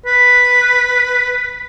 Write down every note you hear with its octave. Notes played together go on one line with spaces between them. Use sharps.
B4